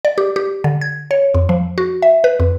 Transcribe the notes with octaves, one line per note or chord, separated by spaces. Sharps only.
D5
G4
G4
D3
G#6
C#5
F2
F3
F#4
E5
B4
F2